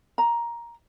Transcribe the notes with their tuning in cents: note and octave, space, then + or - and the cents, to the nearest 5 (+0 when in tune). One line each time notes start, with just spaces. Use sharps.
A#5 +10